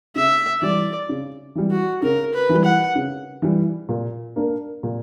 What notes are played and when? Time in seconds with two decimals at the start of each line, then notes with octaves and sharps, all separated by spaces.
0.15 C#3 E5
0.62 E3 G3 D5
1.09 C#3
1.55 E3 G3
1.71 F#4
2.02 C#3 A#4
2.34 B4
2.49 E3 G3
2.65 F#5
2.95 C#3
3.42 E3 G3
3.89 A#2
4.36 A#3 D4 A#4
4.83 A#2